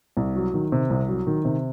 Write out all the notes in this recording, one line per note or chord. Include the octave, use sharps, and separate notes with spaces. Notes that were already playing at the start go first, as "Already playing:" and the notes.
C2
F#3
D#3
C3
C2
F#3
D#3
C3